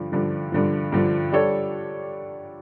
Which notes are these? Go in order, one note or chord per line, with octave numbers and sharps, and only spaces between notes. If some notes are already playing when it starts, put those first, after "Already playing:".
Already playing: G2 D3 F3
G2 D3 F3
G2 D3 F3
G2 D3 F3
G3 D4 A4 C#5